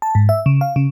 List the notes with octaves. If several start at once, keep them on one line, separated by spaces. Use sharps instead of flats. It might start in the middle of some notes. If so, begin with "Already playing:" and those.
A5
G#2
E5
C#3
F5
C#3